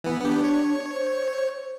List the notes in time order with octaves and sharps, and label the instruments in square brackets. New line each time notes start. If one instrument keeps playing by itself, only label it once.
[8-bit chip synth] E3 B3
[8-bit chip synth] B3 G4 [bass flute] D4
[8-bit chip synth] C#5
[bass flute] C5